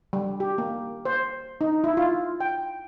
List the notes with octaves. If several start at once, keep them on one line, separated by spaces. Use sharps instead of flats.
G3
G4
A#3
C5
D#4
E4
F4
G5